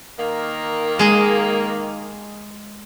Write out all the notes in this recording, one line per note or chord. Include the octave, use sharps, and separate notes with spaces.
D#3 A#3
G#3 G#4 D#5